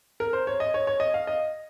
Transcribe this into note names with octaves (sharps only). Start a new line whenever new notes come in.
A#4
C5
C#5
D#5
C#5
C#5
D#5
F5
D#5